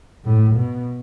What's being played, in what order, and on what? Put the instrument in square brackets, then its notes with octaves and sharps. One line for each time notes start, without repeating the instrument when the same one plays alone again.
[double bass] A2
B2